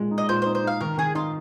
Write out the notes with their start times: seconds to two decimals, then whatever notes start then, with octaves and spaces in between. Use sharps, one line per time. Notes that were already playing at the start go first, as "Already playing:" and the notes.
Already playing: A#2 G#3
0.11 D#4
0.18 D#5
0.29 A#2 C5
0.42 C5
0.46 D#4
0.55 C5
0.64 D#4 F5
0.81 D#3 A#4
0.98 D#3 G#4
1.15 D#4 F4